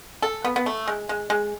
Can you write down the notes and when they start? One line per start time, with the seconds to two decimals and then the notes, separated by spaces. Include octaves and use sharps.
0.22 A4
0.44 B3
0.56 B3
0.66 A3
0.88 G#3
1.09 G#3
1.30 G#3